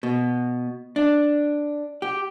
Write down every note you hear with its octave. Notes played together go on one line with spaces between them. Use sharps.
B2
D4
G4